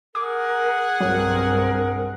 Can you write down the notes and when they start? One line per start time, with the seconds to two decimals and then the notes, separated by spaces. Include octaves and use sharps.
0.15 G#4 A#4 F#5 D6
1.00 B1 G2 F#3 C4 A#4